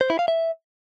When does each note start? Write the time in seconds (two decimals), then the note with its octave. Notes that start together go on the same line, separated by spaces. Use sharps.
0.01 C5
0.10 E4
0.19 F5
0.28 E5